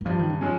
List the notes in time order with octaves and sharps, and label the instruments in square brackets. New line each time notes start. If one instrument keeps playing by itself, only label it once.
[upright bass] D#3
[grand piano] G2 [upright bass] F3
[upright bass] D#3
C#3
[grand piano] F3 G#3 C#4